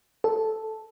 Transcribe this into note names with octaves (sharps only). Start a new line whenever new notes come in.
A4